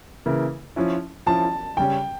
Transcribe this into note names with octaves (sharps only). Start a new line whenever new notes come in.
C#3 E3 A#3 E4
F3 C#4 E4
F3 C#4 E4 A5
C#3 G3 C#4 G5